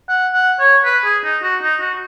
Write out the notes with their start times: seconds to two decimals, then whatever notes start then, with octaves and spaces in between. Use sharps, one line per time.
0.09 F#5
0.34 F#5
0.60 C#5
0.85 B4
1.04 G#4
1.24 D#4
1.42 F#4
1.62 D#4
1.80 F#4